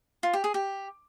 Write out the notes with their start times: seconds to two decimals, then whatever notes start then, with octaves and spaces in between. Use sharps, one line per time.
0.23 F4
0.33 G4
0.44 G#4
0.54 G4